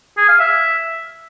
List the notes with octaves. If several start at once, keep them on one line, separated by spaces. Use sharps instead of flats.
G#4
F5
E5